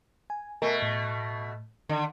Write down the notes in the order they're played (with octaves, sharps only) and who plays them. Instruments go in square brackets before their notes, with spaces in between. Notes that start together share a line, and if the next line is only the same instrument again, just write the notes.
[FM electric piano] G#5
[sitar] B2 A3 [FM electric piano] A#4 G#5
[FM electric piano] A2
[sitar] D3 [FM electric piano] D#3